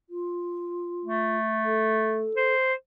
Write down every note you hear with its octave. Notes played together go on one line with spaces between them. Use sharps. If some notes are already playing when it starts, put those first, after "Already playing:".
F4
A3
A4
C5